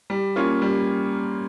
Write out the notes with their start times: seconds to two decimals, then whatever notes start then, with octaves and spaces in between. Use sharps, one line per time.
0.10 G3
0.36 A#3 C#4 F4
0.62 G3